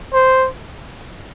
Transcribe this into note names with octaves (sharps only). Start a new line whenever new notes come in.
C5